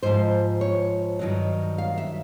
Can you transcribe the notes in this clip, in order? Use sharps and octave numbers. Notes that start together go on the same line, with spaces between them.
G#2 F3 C5
C#5
G2 D#3 F#3
F5
E5